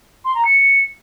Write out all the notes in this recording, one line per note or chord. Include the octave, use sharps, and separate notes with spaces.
C6
A#5
C#7